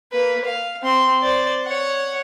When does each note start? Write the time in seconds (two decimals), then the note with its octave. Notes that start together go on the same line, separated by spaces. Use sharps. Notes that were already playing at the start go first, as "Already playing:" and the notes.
0.12 A#3 B4
0.45 F5
0.83 C4 C6
1.23 C5 D5
1.64 C#5 F#5